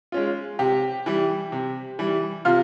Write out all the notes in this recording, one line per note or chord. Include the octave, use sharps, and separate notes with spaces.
G#3 C#4 F4
C3 G4
E3 G3
C3
E3 G3
C3 F4